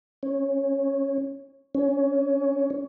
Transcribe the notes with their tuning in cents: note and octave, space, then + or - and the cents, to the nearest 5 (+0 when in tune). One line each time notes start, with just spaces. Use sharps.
C#4 -10
C#4 +15